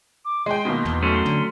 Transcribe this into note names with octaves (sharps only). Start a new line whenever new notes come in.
D6
G#3 G5 C6
B2 D#3 A#3
E2
F#3 A3 C#4 C6
D3